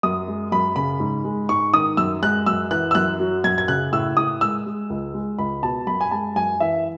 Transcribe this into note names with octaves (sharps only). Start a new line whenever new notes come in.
F#2 D#6
G#3
F#2 B5
C#3 B5
G#2
G#3
G#2 C#6
D#3 D#6
F#2 E6
G#3 F#6
F#2 E6
E3 F#6
E6
F#2 F#6
F#3
F#2 G#6
G#6
C#3 F#6
A2 E6
A2 D#6
G#3 E6
G#3
C#2
G#3
C#2 B5
B2 A5
F#2 B5
G#5
G#3 A5
F#2 G#5
E3 E5